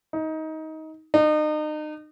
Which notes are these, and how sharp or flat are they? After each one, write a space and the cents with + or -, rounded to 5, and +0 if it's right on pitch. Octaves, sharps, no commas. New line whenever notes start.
D#4 +20
D#4 -35